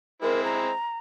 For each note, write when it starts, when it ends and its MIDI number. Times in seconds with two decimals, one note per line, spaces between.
0.22 0.70 56
0.22 0.70 60
0.22 0.70 64
0.22 0.41 70
0.44 0.99 82